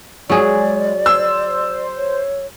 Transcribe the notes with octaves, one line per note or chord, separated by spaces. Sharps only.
F#3 G#3 G#4 D5
C5 E6
C#5